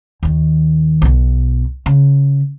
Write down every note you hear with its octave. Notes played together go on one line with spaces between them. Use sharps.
D#2 D#3
B1 B2
C#3